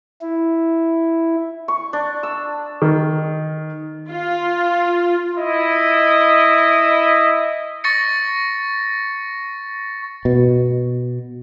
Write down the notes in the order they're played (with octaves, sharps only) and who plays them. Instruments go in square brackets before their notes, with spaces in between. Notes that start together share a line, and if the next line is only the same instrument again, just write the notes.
[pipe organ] E4
[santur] C#6
D4
E6
[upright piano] D#3
[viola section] F4
[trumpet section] E4 D#5
[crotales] C#6 A6 A#6 C#7
[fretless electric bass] B2